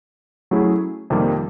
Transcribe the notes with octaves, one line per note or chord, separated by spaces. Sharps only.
F#3 A3 C#4 E4 G#4
F2 C3 D#3 G3 A#3